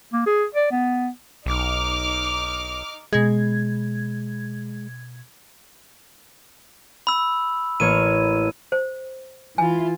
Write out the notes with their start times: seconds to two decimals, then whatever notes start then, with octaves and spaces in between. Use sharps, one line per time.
0.13 A#3
0.26 G#4
0.55 D5
0.71 B3
1.46 B1 D#4 D6 F6
3.13 B2 G#3 G#6
7.07 B5 E6
7.80 A1 A#3 C#5 D#7
8.72 C5
9.58 E3 E4 F4 G#5